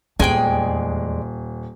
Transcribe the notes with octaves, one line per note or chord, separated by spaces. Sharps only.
D#1 E2 G#3 D5 G5 G#5